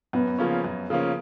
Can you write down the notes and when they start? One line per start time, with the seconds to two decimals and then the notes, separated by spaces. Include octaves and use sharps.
0.13 F#2 B3
0.38 C#3 F3 A#3 C#4
0.64 F#2
0.90 C#3 F3 A#3 C#4